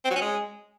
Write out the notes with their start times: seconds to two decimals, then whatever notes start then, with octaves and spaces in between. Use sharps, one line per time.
0.05 C4
0.10 F#3
0.16 C#4
0.21 G#3